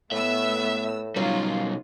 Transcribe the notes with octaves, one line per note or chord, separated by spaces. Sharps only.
A2 A3 B3 E5 E6
B2 F#3 G3 C#4 D#4 F4